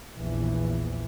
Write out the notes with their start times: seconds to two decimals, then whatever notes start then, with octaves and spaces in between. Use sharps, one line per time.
0.16 A#1 E2 E3